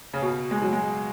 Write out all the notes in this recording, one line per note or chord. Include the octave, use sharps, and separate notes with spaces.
C#3
B2
G#3
F#3
G#3